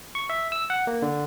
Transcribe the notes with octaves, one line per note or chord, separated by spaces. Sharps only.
C#6
E5
E6
F#5
A#3
D3